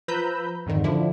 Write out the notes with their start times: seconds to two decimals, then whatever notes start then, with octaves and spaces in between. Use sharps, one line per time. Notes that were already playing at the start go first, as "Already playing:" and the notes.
0.08 F3 B4 A#5 B5 E6 G6
0.66 F2 G#2 D3 D#3
0.84 D3 F3 D4 E4